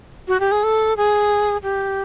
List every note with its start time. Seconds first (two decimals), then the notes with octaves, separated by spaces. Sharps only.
0.28 F#4
0.40 G4
0.51 G#4
0.63 A4
0.97 G#4
1.63 G4